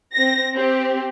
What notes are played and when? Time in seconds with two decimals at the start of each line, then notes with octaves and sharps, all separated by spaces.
0.13 C4 A#6
0.56 C4 G4